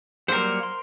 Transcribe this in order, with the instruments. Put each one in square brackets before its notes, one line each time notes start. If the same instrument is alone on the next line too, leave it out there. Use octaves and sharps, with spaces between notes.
[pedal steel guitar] F#3 G3 A#3 [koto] A#4 C5
[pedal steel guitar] C6